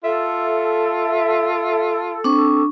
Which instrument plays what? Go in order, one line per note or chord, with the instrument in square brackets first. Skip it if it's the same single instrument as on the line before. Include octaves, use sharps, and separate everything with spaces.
[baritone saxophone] F4 [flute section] A4 [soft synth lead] E5
[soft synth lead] C4 [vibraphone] D4 C#6